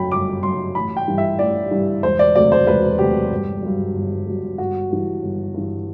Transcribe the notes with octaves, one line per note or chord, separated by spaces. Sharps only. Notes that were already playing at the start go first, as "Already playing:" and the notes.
Already playing: G1 F#2 F#3 G5 B5
G1 D6
F#2 F#3 C6
A1 B5
G5
G2 E3 G3
E5
A1 D5
G2 E3 G3
E1 C5
D5
D2 C3 F#3 D5
C5
E1 B4
D2 C3 F#3 G4
G1
G2 F#3
G1
G2 F#3
G1 F#4
G2 E3
G1
G2 E3